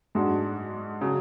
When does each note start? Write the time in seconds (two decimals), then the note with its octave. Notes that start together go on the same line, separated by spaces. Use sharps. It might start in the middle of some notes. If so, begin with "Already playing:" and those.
0.15 G#2 G#3 D4 F#4
1.01 C#3 F#3